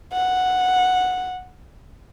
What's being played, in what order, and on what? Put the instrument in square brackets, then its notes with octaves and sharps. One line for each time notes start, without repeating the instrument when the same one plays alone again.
[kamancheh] F#5